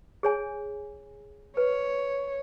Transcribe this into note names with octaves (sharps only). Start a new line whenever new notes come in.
G#4 C#5 G#5
B4 C#5